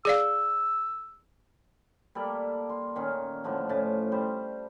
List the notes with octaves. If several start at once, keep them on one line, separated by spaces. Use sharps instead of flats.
G#4 D5 F5 E6
G3 A#3 A4 D5
C6
A#2 D#3 C#4
A2 D3 F3 D4
A2 C#4 A5
G3 C5